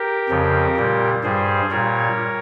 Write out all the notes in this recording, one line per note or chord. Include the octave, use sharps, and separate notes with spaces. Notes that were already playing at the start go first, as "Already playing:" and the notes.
Already playing: G4 A#4
F2 C#3 F3
A#2 G3
G2 G3 G#4 C5
A#2 G3 A#4 C#5